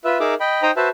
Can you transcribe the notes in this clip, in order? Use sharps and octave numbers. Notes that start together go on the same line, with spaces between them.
F4 B4 E5
D#4 G#4 A#4 E5 D6
D#5 G5 B5
D#4 C5 G5 A#5 D#6
F#4 B4 C5 E5 A5